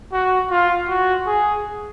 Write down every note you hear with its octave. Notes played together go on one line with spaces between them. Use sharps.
F#4
F4
F#4
G#4